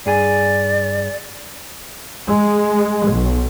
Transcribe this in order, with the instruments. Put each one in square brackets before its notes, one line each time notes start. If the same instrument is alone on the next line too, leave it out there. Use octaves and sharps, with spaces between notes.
[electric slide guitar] G2 G#4 G#5 [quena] D5
[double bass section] G#3
B1